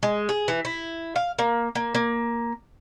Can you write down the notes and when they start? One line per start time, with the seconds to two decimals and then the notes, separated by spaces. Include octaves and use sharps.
0.03 G#3
0.29 G#4
0.48 E3
0.65 E4
1.16 F5
1.39 A#3
1.75 A#3
1.95 A#3